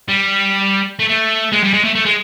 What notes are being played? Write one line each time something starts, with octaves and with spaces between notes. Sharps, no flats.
G3
A3
A3
G#3
G3
G#3
A3
A3
G#3